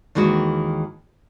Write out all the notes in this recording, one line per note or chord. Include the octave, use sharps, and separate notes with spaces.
D#2 D#3 E3 G#3 F#4